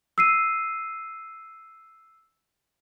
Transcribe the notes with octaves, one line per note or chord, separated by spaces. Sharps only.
E6 C7 D#7